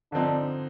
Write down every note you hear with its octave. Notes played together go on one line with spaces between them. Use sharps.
D3 F3 C4 D4 D#4